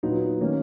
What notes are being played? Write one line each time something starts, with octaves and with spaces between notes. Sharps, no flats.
A#2 F#3 B3 D#4
D#3 A#3 C#4